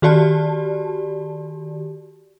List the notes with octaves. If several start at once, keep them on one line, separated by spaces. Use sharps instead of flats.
D#3 F#4 G4 D5 A5